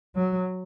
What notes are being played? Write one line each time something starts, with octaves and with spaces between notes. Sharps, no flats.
F#3